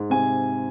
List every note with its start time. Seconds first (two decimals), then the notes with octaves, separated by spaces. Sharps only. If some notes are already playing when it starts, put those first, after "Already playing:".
Already playing: G#2
0.10 C3 G#5